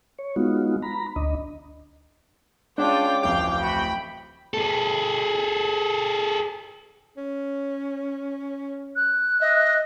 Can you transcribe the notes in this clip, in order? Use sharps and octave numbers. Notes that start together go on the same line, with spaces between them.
C#5
G#3 B3 D#4 F4 F#4
A#5 B5
D2 D4 D#5
G#3 C#4 D4 F4 G5 D6
D1 A1 F2 F5 G5
F#4 B5
G#4 A4
C#4
F#6
D#5 E5